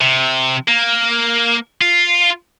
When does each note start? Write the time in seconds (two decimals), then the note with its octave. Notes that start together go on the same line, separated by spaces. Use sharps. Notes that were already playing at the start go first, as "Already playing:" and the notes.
0.01 C3
0.68 A#3
1.81 F4